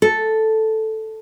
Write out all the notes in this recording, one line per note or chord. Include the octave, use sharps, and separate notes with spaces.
A4